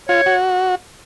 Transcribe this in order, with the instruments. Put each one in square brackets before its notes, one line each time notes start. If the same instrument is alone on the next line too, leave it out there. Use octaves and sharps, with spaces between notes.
[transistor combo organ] F4 [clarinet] C#5
[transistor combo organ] F#4